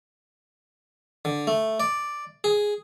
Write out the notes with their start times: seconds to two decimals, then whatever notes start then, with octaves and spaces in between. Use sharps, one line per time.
1.25 D3
1.47 A3
1.80 D5
2.44 G#4